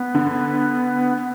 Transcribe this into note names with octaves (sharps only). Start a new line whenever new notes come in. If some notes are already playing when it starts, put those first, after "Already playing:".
Already playing: B3
D3
B3